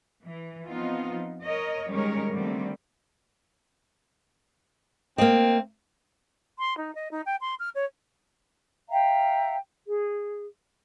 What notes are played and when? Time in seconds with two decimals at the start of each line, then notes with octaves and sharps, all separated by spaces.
0.24 E3
0.68 F3 B3 C4 D#4 F4
1.43 A#4 C#5 D#5
1.89 D#3 G3 G#3 C#4 A#4 C#5
2.31 D3 D#3 G3 A3 C4
5.18 A#3 C4 D#5
6.58 C6
6.77 D#4
6.94 D#5
7.11 D#4
7.25 G5
7.40 C6
7.59 F6
7.74 C#5
8.90 E5 F5 G5 A#5
9.89 G#4